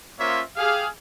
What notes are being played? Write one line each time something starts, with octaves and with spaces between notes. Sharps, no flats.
A#3 C#4 F4 C5 C#5 E5
G4 G#4 F5